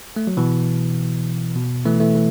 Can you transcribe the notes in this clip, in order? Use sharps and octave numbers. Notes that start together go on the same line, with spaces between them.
A3
F#3
B2 E3
B2
E3 A3
E3 A3
E3